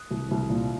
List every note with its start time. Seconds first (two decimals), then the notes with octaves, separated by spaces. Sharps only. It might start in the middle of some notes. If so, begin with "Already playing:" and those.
Already playing: D#6 F#6
0.11 C2
0.31 C2
0.50 A#2